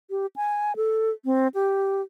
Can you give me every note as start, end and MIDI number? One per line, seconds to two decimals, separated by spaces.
0.10 0.26 67
0.36 0.76 80
0.76 1.11 69
1.25 1.48 60
1.54 2.01 67